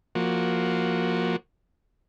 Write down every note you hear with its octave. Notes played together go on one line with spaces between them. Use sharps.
F3 A#3 F#4